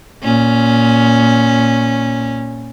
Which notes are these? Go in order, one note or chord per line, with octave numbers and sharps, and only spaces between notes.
A#2 C#4